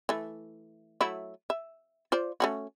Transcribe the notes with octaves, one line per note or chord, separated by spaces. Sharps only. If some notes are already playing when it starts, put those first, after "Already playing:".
E3 A3
F#3 A3 E4
E5
F4 C5 D5
A3 C#4 F#4